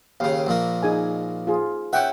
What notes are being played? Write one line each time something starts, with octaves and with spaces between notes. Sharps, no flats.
D#2 C#3 F5
A#1 A#2 A#3
D#4 G#4 G#5
F4 G#4
C#4 E5 F#5 G5